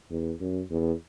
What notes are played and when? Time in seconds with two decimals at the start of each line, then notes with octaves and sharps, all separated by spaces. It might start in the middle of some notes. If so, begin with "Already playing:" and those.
0.11 E2
0.40 F#2
0.71 E2